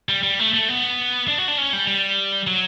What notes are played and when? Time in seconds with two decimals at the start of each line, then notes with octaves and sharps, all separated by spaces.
0.09 G3
0.23 G3
0.39 A3
0.54 A3
0.69 B3
1.28 D4
1.38 F#4
1.48 D4
1.58 C#4
1.73 G3
1.87 G3
2.47 F#3